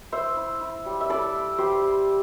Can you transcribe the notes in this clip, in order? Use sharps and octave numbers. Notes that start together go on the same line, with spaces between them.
E4 C5 E5
E4
E4
G3
E5
E4 A4 D5
E4
G3 G4 C5
E4
E4